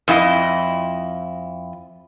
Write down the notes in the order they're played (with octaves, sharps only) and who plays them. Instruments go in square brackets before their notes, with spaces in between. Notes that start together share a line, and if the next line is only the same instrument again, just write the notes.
[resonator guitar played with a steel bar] F2 E4 D#5